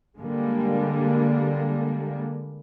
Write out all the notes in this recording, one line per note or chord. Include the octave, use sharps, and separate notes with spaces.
D3 G3 G#3 A#3